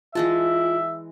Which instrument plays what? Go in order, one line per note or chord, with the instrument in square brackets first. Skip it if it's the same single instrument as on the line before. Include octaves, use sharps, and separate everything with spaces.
[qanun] E3 G#3 A5 [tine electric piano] F4 [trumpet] E5